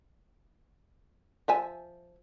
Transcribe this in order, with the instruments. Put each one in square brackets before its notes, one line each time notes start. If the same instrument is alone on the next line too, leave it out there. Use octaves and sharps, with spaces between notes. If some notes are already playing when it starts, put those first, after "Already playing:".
[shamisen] F3 E5 G#5